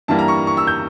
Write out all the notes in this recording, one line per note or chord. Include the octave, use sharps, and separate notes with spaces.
G2 E3 G3 A#3 A5
A#5
C#6
C#6
E6
G6